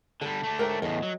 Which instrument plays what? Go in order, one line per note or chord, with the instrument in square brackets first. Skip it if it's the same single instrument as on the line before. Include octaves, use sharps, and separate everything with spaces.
[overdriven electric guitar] D3 G3 [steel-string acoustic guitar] A4
[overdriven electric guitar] A3 D4
[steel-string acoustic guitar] G#2 A#4 G5
[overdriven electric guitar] E2 A2 [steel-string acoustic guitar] D#5
[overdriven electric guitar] F#3